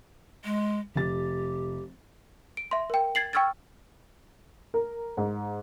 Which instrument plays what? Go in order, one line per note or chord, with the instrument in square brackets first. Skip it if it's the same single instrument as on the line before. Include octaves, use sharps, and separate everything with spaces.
[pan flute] G#3
[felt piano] F1 A6 [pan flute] G4
[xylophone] D7
E5 C6
A#4 G5
G#6 A6 C7 F#7
G5 C#6 E6 F6 G#6 A6
[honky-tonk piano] A#4
G#2